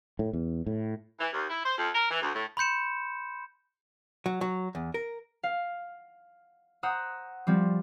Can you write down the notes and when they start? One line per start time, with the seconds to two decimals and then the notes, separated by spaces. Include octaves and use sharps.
0.19 A2
0.33 E2
0.66 A2
1.20 E3
1.33 D#2
1.49 E4
1.64 C5
1.77 F2
1.95 A#4
2.10 E3
2.22 D2
2.34 A2
2.57 B5 C6 G6 C#7 E7
4.26 F#3
4.41 F#3
4.75 E2
4.94 A#4
5.43 F5
6.83 C5 F#5 A#5 D#6 E6 F#6
7.47 F3 G3 C4